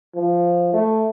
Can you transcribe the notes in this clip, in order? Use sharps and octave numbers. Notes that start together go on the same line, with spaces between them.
F3
A3